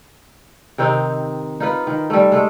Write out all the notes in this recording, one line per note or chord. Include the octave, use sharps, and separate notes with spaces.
C3 D#3 C4 D#4
D#4 F4 B4
D#3
G3 A3
G#3 A3